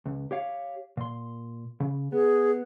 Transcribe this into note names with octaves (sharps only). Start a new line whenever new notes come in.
C#2
G4 C#5 F5
A#2 C6
C#3
B3 G#4